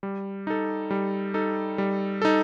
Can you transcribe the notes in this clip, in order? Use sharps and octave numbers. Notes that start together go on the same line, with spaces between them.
G3
D#4 A4
G3
D#4 A4
G3
D#4 A4